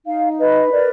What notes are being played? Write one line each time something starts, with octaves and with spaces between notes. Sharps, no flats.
D#4 F5
B4 D#5
A#4 D5